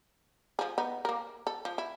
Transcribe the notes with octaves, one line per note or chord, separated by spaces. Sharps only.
F3 G#4
B3 D#4
A#3 A#4
A4
F3
E4